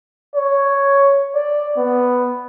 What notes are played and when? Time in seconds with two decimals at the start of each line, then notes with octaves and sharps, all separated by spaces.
0.35 C#5
1.35 D5
1.77 B3